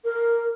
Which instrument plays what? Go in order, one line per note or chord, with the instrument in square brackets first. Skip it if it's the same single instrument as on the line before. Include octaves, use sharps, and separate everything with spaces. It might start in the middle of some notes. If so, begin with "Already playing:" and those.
[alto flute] A#4